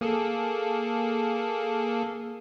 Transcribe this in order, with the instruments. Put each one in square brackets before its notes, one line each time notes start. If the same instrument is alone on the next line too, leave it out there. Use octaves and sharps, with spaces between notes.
[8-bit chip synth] A#3 G#4 A4